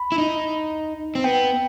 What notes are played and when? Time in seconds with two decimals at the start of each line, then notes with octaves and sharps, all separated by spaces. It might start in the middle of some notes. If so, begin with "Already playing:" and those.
Already playing: B5
0.12 E4
0.18 D#4
1.15 C4
1.24 B3 G5